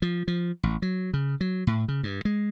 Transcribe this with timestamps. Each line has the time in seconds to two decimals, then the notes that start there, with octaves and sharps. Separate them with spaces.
0.02 F3
0.28 F3
0.63 A1
0.82 F#3
1.14 C#3
1.41 F#3
1.67 A2
1.88 C#3
2.03 G2
2.25 G#3